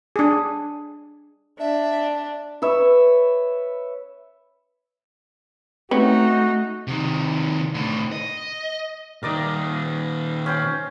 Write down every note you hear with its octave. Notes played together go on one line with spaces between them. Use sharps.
D4 G#4
D4 E5
B4 C#5 E5
A3 C4 C#4 D#4 F#4 B4
C3 D#3
A2 D3
D#5
A#2 D#3 A#4 D5 D#5
C#4 C5 G5